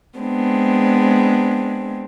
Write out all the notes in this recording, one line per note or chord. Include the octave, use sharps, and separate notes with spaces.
G#3 B3 C4 D4